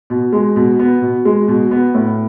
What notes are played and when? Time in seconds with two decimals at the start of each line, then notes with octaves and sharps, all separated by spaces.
0.10 B2
0.33 G#3
0.56 B2
0.79 B3
1.02 B2
1.25 G#3
1.48 B2
1.71 B3
1.94 A2